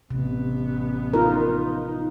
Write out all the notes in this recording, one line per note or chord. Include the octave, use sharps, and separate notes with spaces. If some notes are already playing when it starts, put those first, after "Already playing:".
A1 C3 B3
D#4 F4 A#4